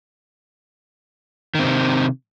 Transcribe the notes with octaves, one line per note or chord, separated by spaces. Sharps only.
C3 D#3 C4